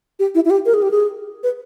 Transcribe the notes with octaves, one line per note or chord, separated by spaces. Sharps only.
G4
E4
E4
G4
A#4
G#4
G4
G#4
B4